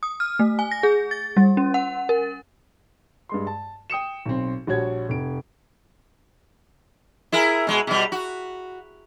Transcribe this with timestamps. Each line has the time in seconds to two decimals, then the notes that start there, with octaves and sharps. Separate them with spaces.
0.03 D#6
0.20 F6
0.39 A3
0.59 G#5
0.71 A#6
0.83 G#4
1.11 A6
1.37 G3
1.57 C#4
1.74 F#5
2.09 A#4
3.29 G2 G#3 C6
3.47 A5
3.90 G5 D#6 C#7 E7
4.25 B1 C4
4.67 A#1 G3 F#4 C#5 G#6
5.09 F1 D7
7.32 E4 G#4 A#4
7.67 B2 G#3
7.87 B2 G3
8.12 F#4